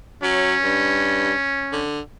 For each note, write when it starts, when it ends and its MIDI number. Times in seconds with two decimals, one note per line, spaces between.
0.23 0.55 54
0.23 1.87 61
0.63 1.33 43
1.72 2.00 50